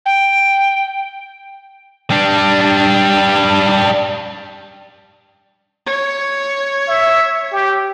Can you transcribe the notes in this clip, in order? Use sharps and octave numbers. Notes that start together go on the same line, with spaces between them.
G5
G3 D4
C#5
E5
G4